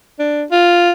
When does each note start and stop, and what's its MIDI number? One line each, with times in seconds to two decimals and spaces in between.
0.19 0.45 62
0.51 0.91 65